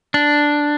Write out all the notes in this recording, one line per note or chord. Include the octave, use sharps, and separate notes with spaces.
D4